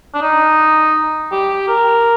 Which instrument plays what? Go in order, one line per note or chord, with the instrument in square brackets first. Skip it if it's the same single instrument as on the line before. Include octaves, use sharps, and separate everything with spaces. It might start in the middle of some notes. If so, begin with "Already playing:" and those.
[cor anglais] D4
D#4
G4
A#4